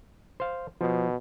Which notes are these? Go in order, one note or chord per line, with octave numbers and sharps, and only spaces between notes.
C5 F5
B2 F3